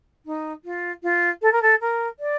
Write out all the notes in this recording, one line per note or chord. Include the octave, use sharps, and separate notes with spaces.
D#4
F4
F4
A4
A#4
A4
A#4
D5